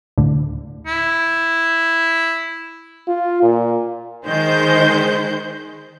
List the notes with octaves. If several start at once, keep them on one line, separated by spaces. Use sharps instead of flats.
D2 A2 D3
E4
F4
A#2
D#3 G#3 C5 G6